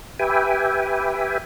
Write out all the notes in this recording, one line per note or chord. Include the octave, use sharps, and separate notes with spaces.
G4 B4 E5 G5 G#5